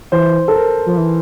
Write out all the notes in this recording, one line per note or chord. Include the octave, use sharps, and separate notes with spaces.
E3 C5
A4
A#4
F3
E3